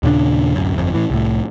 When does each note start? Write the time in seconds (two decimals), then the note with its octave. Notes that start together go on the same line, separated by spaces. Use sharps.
0.03 D#2 A#2 C#3 D4
0.55 D1 F#2
0.76 G1 F2
0.94 A2 E3
1.10 C2 A2